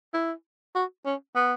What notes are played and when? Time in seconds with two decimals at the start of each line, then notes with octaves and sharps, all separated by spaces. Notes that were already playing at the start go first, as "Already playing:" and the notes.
0.14 E4
0.75 F#4
1.06 C#4
1.36 B3